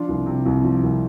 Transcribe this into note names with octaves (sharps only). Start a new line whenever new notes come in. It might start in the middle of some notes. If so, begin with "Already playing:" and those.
Already playing: F3 D4 F4
C2
C3
C2
F3
C2